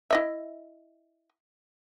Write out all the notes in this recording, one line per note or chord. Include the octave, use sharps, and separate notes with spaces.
E4 D#5 E5